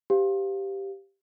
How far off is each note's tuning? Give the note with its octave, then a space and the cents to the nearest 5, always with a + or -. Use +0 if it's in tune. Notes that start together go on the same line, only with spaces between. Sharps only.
G4 +0 C5 -35 F5 +0